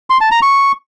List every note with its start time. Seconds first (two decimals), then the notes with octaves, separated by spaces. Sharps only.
0.10 C6
0.21 A5
0.31 A#5
0.42 C#6